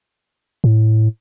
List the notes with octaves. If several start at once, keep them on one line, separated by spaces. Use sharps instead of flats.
A2